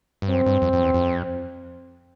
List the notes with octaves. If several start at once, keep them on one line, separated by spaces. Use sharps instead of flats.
G2
F#2 C4
G2
F2
F2
E2
F2